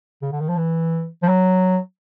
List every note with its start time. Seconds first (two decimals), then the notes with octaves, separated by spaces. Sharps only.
0.22 C#3
0.32 D3
0.40 D#3
0.49 F3
0.57 E3
1.22 F3
1.28 F#3